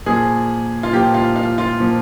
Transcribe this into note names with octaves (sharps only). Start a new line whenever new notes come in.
A#2 F3 G#4
F4
A#2 F3 G4
F4
F4
F4
A#2 F3